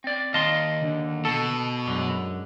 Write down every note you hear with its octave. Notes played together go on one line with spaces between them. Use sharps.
C4 D5
D#2 D#5 F5 A5 C6
D3
B2 A4
F#2 D3 G#3